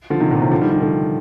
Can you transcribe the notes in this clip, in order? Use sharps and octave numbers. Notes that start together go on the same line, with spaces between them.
D3 F3
C3 D#3
A#2 D3
A2 C3
D3 F3
D#3 G3
D#3 G3
D3 F3